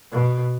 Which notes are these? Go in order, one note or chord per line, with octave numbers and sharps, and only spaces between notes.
B2